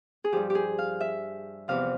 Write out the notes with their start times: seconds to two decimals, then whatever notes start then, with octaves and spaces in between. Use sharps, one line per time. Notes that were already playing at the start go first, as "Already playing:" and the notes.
0.24 G#4
0.32 G2 F3 G4
0.50 G4
0.55 G#4
0.79 F5
1.01 E5
1.68 E2 C3 F3 F5